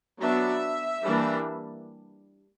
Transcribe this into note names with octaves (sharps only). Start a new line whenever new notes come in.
F#3 B3 D4 E5
E3 G3 A#3 D4